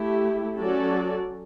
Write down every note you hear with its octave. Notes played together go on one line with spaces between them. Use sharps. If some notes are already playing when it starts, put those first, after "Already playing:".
Already playing: A3 E4 G4
F#3 C#4 F#4 A4 D5